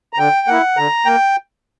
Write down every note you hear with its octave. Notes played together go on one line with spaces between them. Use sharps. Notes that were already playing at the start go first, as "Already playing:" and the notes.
A#5
D3 G5
A#3 E4 F#5
D3 A#5
A#3 G5